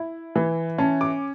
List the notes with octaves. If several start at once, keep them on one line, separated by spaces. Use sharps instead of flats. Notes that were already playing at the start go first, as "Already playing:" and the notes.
Already playing: E4
E3
C#4 A5
D6